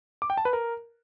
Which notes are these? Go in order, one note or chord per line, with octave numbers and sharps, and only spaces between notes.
D6
G5
A5
B4
A#4